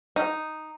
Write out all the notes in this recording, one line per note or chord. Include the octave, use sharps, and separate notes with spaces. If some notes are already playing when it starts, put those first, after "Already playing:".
D#4